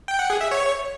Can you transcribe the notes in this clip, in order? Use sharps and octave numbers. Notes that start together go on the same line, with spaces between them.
G5
F#5
G#4
E5
C#5